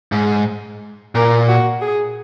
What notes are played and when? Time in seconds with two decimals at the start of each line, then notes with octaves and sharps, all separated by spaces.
0.12 G#2
1.15 A#2 A#4
1.48 F#4
1.81 G#4